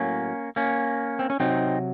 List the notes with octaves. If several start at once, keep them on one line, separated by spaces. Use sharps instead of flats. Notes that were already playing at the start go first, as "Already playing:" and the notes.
Already playing: A2 F#3 A#3 C#4
A#3 C#4
C4
C#4
C3 F#3 C4 D#4